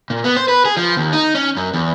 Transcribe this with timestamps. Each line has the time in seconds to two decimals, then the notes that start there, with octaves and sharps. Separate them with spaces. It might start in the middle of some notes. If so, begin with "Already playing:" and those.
0.10 A#2
0.24 B3
0.37 C5
0.48 B4
0.65 G#4
0.77 F3
0.97 D#2
1.13 D#4
1.35 C#4
1.57 F#2
1.74 E2